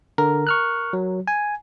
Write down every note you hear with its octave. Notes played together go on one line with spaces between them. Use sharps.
D3 A#4
C#6 F6 F#6
F#3
G#5